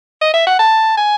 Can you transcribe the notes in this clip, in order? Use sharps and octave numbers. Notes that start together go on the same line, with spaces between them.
D#5
E5
F#5
A5
G#5